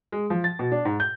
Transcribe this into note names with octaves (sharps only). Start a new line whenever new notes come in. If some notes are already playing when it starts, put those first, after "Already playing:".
G#3
F3
A6
B2
D4
G#2
G6